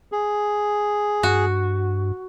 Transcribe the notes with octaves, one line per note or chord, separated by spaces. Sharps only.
G#4
G2 F#4